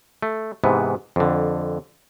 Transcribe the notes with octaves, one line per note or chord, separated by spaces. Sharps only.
A3
G#2 C3 E3 B3
F2 D3